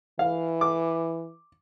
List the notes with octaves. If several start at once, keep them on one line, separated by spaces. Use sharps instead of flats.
E3 F5
D6